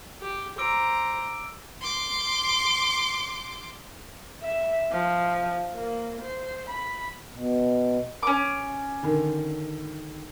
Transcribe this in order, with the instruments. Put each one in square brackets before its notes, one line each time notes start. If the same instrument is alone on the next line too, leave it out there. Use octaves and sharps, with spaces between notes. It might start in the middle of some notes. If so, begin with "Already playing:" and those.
[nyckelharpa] G4
[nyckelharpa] C5 A#5 [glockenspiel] D6 E6 D7
[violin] C6 D6
[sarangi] E5
F3
A#3
C5
B5
[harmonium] B2
[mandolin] C#4 D6
[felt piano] D3 D#3